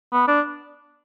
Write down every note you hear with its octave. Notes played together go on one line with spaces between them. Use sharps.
B3
D4